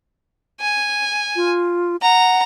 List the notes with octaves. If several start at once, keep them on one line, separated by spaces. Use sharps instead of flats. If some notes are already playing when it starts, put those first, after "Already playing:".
G#5
F4
F#5 A#5